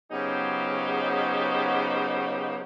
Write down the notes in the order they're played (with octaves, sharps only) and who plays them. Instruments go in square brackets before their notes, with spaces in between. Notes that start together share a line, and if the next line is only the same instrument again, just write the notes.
[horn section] C#3 F#3 B3 D#4 G4 C5